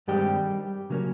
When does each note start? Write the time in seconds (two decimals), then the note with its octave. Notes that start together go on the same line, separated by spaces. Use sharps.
0.08 G2 D#3 G3 G#3 C4 G4
0.90 C#3 F#3 A#3 C#4